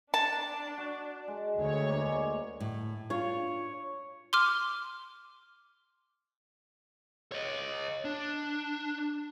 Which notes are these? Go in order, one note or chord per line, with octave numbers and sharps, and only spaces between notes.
D4 A5
F#4
G#3
D2 C#5 E5
G#3 A#3 D5
A2
D4 F4 C#5
C6 D6 F6
C#5 D#5
D4